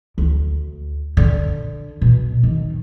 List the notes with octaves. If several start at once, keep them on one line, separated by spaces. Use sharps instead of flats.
D2
D3
B2
D#3